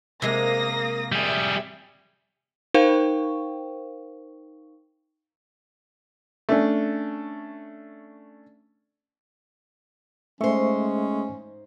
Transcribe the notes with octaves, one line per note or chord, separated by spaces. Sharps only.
C3 G#3 A#3 D#6 A#6
G3 G#4 E5
D#4 A#4 C5 F5 G5 C#6
A3 C#4 D4
G#2 G#3 A3 C#4 C5 E5 C#6